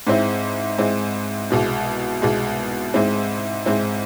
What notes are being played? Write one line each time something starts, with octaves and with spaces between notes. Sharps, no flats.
G#2 G#3 C4 E4
G#2 G#3 C4 E4
C2 B2 G#3
C2 B2 G#3
G#2 G#3 C4 E4
G#2 G#3 C4 E4